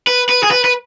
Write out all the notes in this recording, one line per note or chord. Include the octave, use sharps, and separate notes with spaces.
B4
B4
G#4
B4
B4